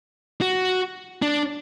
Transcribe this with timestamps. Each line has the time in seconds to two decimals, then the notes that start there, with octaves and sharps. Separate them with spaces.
0.41 F#4
1.22 D4